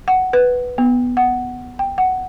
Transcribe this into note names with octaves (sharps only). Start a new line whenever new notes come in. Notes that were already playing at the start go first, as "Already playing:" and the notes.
F#5
B4
B3
F#5
G5
F#5